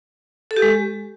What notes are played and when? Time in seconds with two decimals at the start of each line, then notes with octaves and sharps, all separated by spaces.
0.51 A4
0.56 G4
0.62 G#3